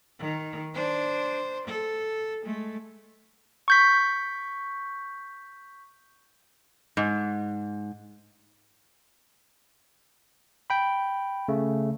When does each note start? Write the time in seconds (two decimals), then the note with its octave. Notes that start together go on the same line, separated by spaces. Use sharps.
0.19 D#3
0.74 D4 C5
1.68 A4
2.42 G#3 A3
3.68 C#6 G6 B6
6.97 G#2
10.70 G5 B5
11.48 C#3 A3